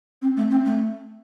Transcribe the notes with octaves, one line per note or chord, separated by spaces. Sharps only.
C4
A3
C4
A3